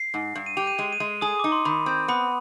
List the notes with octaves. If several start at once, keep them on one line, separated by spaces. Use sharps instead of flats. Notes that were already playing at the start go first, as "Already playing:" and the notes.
Already playing: C7
G#2
G2
D#7
G4 F7
D#7
G#3 D#7
D#7
G#3
G#4 D#6
D#4 D6
C6
D#3 B5
C4
B3 B5